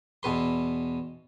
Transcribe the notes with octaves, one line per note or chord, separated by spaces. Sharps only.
E2 B2 B4 C6